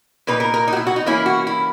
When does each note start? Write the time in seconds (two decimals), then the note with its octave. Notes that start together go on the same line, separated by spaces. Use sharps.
0.27 A#2 A#3 D#4 B4
0.40 A#4
0.54 A#4
0.68 D#4
0.73 F#4
0.77 E4
0.87 F#4
0.96 D#4
1.06 E3 A#3 C#4 E4
1.26 F#4
1.47 E4